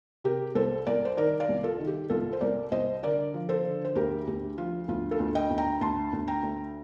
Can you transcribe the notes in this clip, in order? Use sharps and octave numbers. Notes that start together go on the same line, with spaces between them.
C3 G4 A#4
C2 A4 C5
C2 A#4 D5
C5
D#3 A#4 D5
D5 F5
C2
F4 A4
D#3
G4
C2 F4 A4
C5
C2 A#4 D5
C2 C5 D#5
D3 A#4 D5
F3
A4 C5
D3
C5
D2 G4 A#4
D2 G4
F3 F4
D2 F4
F4 A4
D2
D#5 G5
D2
G5 A#5
D2 A5 C6
D2
G5 A#5
D2